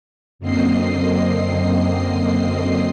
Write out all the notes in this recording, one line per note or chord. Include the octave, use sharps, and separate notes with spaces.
F#2 D3 A#3 C4 D#5 C7